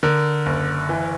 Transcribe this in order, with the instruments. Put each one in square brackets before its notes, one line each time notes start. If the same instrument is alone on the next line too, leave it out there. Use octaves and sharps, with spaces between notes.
[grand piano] D3 A#4
F#1
E3